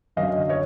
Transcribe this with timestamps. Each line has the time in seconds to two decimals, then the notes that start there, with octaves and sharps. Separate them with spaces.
0.16 F#2 D3 F#3 D#5 F5
0.49 C#5 D#5